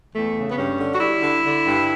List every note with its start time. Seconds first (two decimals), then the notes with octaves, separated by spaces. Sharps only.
0.12 E2 A3
0.34 C#3
0.51 B3
0.56 G2 C#4
0.77 D3
0.94 F#4
0.99 G3 E4
1.21 D3
1.43 D3
1.66 G2